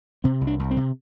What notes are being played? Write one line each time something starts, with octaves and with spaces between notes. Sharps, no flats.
C3 C4
C2
D4
C2
C4
C3